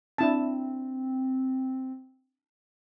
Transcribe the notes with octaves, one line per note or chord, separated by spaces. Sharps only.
C4 D4 E4 A5